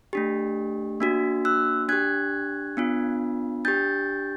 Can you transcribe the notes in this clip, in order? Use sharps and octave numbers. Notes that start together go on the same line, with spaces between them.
A3 D4 G4
A#3 D4 F#4
E6 F#6
D4 G4 F#6 G#6
B3 D4 F4
D4 G4 G6 A6